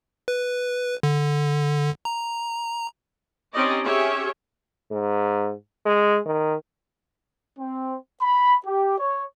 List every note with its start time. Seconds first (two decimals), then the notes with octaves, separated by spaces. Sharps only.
0.28 B4
1.03 D3
2.05 A#5
3.54 C4 C#4 D#4 G4 D5 D#5
3.84 C#4 G4 G#4 C#5 E5
4.91 G#2
5.86 G#3
6.26 D#3
7.59 C4
8.22 B5
8.66 G4
8.99 C#5